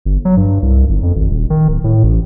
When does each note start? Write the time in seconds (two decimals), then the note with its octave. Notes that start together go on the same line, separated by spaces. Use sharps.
0.05 G1
0.25 F#3
0.37 G2
0.62 C2
0.89 G1
1.03 F2
1.16 G#1
1.30 D#1
1.50 D#3
1.68 D1
1.84 A2
2.03 A1